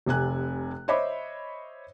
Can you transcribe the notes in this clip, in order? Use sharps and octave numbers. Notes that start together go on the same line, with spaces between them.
F1 C3 G#5 F#6
C5 C#5 D#5 E5 B5 D6